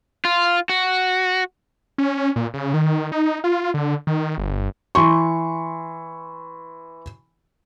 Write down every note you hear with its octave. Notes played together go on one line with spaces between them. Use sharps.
F4
F#4
C#4
A#2
C#3
D#3
D#4
F4
D3
D#3
G1
E3 C6 C#6